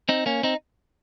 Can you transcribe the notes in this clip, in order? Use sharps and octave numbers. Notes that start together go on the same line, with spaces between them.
C4 D#4
A#3 C#4
C4 D#4